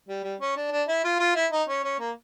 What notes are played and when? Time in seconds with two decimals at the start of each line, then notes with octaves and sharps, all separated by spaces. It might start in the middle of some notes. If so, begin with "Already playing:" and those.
0.09 G3
0.24 G3
0.41 C#4
0.57 D4
0.71 D4
0.88 E4
1.04 F4
1.20 F4
1.35 E4
1.52 D#4
1.68 C#4
1.84 C#4
1.99 A#3